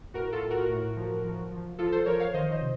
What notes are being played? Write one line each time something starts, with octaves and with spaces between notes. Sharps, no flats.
A2 F#4 A#4
F4 A4
A2
F#4 A#4
A2
F3
F3
F3
F3 F4 A4
A4 C5
F3 A#4 C#5
C#5 F5
D#3 C5 D#5
C5 D#5
C3